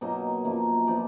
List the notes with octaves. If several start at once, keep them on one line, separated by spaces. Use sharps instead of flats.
B2 F#3 A#3 D#4 D#5
F#2 F3 A#3
F3 B3 D#4 D5